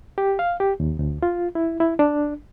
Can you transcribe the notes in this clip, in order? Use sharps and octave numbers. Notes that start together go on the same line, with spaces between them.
G4
F5
G4
D#2
D2
F4
E4
E4
D4